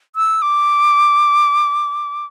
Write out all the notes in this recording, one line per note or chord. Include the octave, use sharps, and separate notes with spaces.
E6
D6